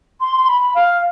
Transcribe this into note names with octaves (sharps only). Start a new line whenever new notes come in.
C6
C6
B5
F5